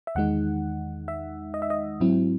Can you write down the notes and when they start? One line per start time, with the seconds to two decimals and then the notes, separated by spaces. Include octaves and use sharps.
0.07 E5
0.15 E2 D#3 G#3 D#4 F#5
1.08 E5
1.54 D#5
1.62 E5
1.70 D#5
2.00 G#2 F#3 C4 E4